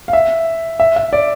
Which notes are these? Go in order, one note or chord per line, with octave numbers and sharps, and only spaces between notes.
F5
E5
E5
E5
D5